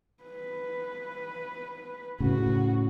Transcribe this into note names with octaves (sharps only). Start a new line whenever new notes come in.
B4
A2 C#3 F#4